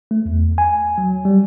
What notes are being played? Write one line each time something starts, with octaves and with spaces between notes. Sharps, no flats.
A3
E2
G#5
F#3
G3